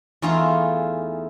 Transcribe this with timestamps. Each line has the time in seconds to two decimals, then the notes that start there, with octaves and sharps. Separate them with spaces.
0.22 E2 A3 D#4 F4 G#4 A#5